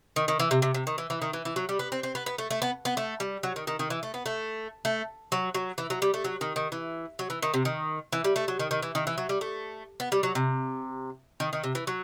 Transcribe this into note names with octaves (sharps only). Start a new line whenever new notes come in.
D#3
D#3
E3
C3
C3
C3
D#3
E3
E3
D#3
E3
E3
F#3
G3
B3
C4
C4
B3
B3
A3
A3
B3
B3
A3
G3
F#3
D#3
D#3
D#3
E3
A3
B3
A3
A3
F#3
F#3
E3
F#3
G3
A3
F#3
D#3
D#3
E3
F#3
E3
D#3
C3
D#3
E3
G3
A3
F#3
D#3
D#3
E3
D#3
E3
F#3
G3
A3
B3
G3
F#3
C3
D#3
D#3
C3
E3
F#3